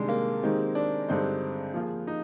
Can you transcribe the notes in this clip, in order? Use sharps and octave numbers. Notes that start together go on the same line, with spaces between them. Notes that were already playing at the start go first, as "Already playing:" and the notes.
Already playing: C3 D#3 G3 G#3 D4
A#3
D#3 G#3 C4 D#4 G4
D4
G2 D3 G#3 C4 D#4
F3 A#3 F4 G#4
D#4